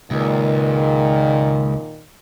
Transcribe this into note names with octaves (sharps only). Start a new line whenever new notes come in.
C#2 A#2 D#3